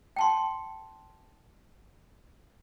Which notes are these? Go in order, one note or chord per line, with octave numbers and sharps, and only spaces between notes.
G5 A5 C6